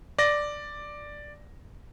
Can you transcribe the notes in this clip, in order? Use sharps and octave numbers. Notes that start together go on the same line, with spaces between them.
D5 A#6